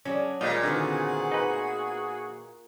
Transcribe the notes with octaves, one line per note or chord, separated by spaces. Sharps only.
F#3 C#4 D4 G#4
A#2 G3 G#3 D#5 F5
D3 D#3 B3 C4 F4 F#4 G#4
D#4 B4